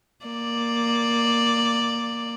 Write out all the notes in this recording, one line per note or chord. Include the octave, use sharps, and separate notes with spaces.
A#3 D5